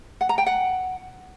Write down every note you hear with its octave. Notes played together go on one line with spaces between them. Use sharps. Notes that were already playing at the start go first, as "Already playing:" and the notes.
F#5
A#5
G5
F#5